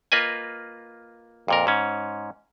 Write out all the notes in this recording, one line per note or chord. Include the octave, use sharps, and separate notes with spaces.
A#3 F4 B4 D#5 G#5
F2 A#2 A#4
G#2 C#4